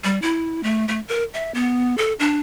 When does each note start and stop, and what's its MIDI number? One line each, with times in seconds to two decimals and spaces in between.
0.04 0.21 55
0.22 0.63 64
0.63 0.85 57
0.88 1.00 57
1.08 1.24 70
1.34 1.52 76
1.54 1.97 59
1.98 2.13 69
2.20 2.41 62